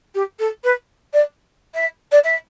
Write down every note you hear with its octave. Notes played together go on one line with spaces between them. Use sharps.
G4
A4
B4
D5
E5
D5
E5